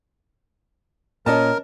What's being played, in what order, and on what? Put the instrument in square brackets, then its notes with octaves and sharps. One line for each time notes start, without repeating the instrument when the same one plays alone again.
[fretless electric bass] A#2 [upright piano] C#4 D#5 A5 [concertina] A#4